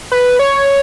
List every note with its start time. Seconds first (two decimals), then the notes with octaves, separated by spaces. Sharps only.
0.12 B4
0.39 C#5